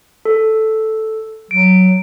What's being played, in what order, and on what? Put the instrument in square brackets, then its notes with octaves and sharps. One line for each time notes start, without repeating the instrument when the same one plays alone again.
[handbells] A4
[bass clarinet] F#3 [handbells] D7